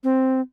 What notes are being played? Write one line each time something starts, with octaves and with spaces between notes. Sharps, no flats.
C4